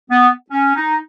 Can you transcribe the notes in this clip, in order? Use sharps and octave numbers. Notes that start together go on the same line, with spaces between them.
B3
C#4
D#4